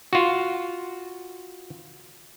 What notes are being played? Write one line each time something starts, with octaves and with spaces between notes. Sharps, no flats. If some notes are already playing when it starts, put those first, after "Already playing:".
F4 F#4